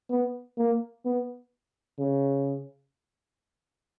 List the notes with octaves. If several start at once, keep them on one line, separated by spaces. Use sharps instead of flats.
B3
A#3
B3
C#3